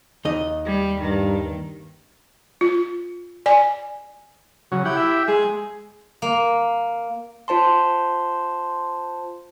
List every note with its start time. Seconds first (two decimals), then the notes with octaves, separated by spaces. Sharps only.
0.25 D#2 D#4 D#5
0.65 G3
1.01 G2 D#3
2.61 F4
3.46 D5 G#5
4.72 C#3 F#3 F#4
4.85 E4 G4 F#5
4.97 G4 E5
5.28 G#3 G#4
6.22 A#3
7.48 F4 C5 A5 C6